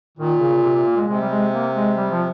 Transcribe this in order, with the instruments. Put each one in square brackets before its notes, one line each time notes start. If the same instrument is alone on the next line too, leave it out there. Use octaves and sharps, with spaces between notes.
[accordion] A#2 [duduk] D#3
[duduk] C#3
C#3
C3
C3
A#3
G#3
[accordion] C3 [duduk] G#3
[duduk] G3
G#3
A#3
G#3
G3
F3